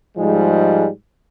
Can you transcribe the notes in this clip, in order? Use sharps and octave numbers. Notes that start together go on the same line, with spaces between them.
G#2 F3 G3 G#3